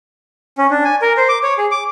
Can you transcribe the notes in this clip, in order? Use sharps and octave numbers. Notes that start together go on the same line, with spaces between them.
C#4
D4
G#5
A#4
C5
D6
C#5
G#4
D6